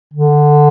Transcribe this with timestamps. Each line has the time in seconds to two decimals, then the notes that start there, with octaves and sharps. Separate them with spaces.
0.14 D3